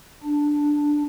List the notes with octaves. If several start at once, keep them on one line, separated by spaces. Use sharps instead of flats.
D4